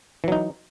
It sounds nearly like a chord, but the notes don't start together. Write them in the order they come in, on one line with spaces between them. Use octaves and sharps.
E3 F#3 D#4